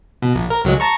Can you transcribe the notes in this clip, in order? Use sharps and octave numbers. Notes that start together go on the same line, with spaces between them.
B2
A#1
A#4
C#2 F#3 G#3
A5 A#5 C#6